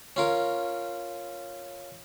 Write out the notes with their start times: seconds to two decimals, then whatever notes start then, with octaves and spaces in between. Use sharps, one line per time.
0.16 C#4 F4 A#4